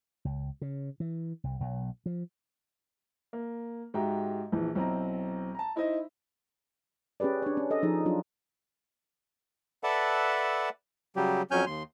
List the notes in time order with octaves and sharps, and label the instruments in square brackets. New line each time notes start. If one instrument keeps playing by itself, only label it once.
[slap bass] C#2
C#3
E3
C2
B1
F3
[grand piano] A#3
G#2 F#4 G4 E5 G5 A#5
A#1 E3
B1 C4 E4 A#5
A5 A#5
D#4 E4 C5 D#5 E5
[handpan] C#4 G4 G#4 B4 D5
D4 C#5
C#4
A4 D#5
F3 D#4 G#4
F#3 D4 F4
[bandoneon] A4 B4 D5 E5 F#5 A5
C#3 F#3 G3 G4
F2 F#3 C#4 G#5 F6 G6
D#2 C6